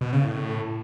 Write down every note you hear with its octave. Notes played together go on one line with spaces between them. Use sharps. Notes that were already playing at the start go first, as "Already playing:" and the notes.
B2
C#3
A2